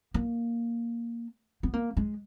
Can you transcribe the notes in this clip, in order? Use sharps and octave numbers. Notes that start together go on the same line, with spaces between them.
A#3
B3
A#3
G#3